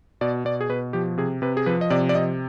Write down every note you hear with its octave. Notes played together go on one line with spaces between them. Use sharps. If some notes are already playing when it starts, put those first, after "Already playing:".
B2 D5
B2 D5
G#4
B2 B4
F3 G4
C3 G#4
C3 B4
G#4
F3 B4
D#5
C3 D5
D5
C3 D#5